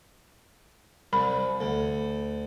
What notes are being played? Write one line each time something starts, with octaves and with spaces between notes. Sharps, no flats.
C2 B5
D2